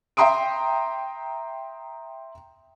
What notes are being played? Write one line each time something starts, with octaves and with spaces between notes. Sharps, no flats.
E5 G5 A#5 C6 D#6 D7